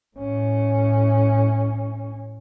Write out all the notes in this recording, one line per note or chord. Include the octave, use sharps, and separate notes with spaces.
A2 C#4